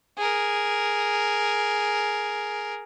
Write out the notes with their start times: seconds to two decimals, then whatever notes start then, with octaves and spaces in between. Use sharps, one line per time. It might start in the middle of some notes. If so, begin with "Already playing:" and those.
0.18 G#4 A#4